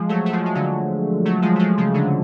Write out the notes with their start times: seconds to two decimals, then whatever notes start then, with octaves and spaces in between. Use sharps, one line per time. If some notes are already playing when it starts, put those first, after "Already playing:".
Already playing: F3 G#3
0.09 F#3 A3
0.26 A3
0.33 F3 G#3
0.46 G#3
0.55 D3 F#3
1.25 F#3 A3
1.42 F3 G#3
1.56 A3
1.59 F3 G#3
1.78 C#3 F3
1.94 D3 F#3